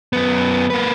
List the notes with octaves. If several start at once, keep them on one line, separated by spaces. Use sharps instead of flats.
F#2 B3
A#3 B4